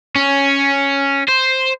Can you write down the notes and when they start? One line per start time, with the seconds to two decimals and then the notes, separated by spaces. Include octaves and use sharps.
0.16 C#4
1.28 C5